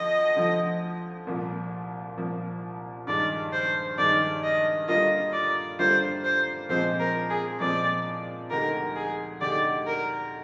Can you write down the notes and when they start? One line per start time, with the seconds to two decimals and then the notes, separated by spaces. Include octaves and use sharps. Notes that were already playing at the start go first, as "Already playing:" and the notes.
Already playing: D2 D3 F3 D#5
0.36 D2 D3 F3
1.27 C2 A#2 F3 A#3
2.17 C2 A#2 F3 A#3
3.07 G2 D#3 G#3 D5
3.53 C5
3.98 G2 D#3 G#3 D5
4.44 D#5
4.88 D3 G3 A#3 D4 F4 D#5
5.33 D5
5.79 D3 G3 A#3 D4 F4 C5
6.24 C5
6.69 A#2 F3 G#3 C4 C5
7.00 A#4
7.30 G#4
7.60 A#2 F3 G#3 C4 D5
8.51 D2 D3 G#3 D#4 G4 A#4
8.96 G#4
9.41 D2 D3 G#3 D#4 G4 D5
9.87 A#4